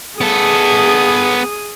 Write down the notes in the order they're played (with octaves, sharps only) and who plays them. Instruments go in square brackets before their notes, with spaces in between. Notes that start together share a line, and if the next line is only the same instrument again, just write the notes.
[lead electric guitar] B3 A4 [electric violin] G#4 D#6